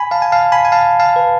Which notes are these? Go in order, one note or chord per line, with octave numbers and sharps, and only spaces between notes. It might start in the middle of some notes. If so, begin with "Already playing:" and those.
Already playing: G#5 B5
F5 A5
G#5
F5 A5
G#5 B5
G#5
F5 A5
F5 A5
B4